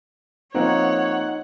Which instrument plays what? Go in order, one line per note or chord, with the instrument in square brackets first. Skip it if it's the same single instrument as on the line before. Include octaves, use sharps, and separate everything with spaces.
[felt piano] F3 A#3 C4 [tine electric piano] D#4 D#5 [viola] C#5 [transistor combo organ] F#5